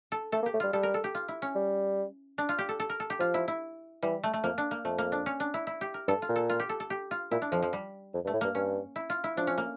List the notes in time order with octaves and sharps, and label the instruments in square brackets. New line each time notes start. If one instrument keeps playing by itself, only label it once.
[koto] A4
[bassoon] A3 [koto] A4
[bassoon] A#3
[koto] G4
[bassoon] A3
[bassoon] G3 [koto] F4
[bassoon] G3 [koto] A4
[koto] A#4
A4
G4
F4
E4
C#4
[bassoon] G3
[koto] D4
F4
G4
A4
A4
A#4
A4
G4
[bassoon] F3 [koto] F4
[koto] E4
E4
[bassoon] E3 [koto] G3
[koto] A3
A3
[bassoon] F2 [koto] A#3
[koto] D4
A#3
[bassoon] F2 [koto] A3
[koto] A#3
D4
C#4
D4
E4
E4
G4
A#4
[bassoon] G2 [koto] A4
[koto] F4
[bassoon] A#2
[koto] A4
F4
G4
A4
A4
G4
F4
[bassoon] A#2 [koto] E4
[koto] D4
[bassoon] F2 [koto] F3
[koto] F3
G3
[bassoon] F2
G2
[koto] A3
[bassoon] A2
[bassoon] G2 [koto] A#3
[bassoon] G2 [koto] C#4
[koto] E4
F4
E4
[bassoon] F3 [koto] D4
[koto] C#4
A#3